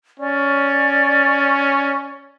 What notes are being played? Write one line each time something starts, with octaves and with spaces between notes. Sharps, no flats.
C#4 D5